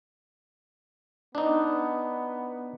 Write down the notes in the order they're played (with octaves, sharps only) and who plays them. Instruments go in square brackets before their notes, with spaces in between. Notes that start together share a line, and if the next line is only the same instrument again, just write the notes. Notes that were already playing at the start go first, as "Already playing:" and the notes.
[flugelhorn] B3 [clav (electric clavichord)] D4 D#4